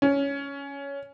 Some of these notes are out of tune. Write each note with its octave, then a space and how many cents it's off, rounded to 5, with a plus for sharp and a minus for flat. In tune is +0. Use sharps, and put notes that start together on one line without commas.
C#4 +10